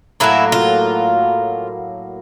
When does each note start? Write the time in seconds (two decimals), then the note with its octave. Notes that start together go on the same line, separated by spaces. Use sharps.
0.20 A2 F#3 A#3 E4
0.52 F4